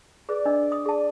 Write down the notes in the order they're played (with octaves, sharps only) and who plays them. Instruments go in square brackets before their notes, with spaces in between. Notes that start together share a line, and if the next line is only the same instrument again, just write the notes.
[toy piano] G#4 B4 C5 [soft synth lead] D5
[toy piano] D4 D#5 E6
D#6
G#4 A5